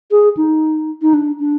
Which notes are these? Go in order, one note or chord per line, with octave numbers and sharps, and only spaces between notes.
G#4
D#4
D#4
D4
D4